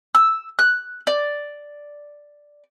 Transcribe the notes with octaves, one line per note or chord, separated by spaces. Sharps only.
E6
F#6
D5